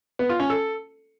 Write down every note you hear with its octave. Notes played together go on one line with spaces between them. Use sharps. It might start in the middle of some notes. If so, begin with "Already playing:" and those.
B3
F4
C#4
A4